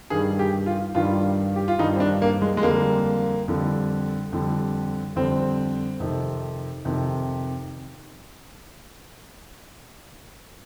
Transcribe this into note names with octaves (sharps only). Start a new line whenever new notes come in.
G2 D#3 G3 G#4
G4
F4
G2 D#3 G3 F4
G4
F4
G2 D#3 G3 D#4
C4
D4
A#3
G#3
G#3
F2 D3 G3 A#3
F2 D3 G3
F2 D3 G3
F2 D3 G3 C4
F2 C3 D#3
F2 C3 D#3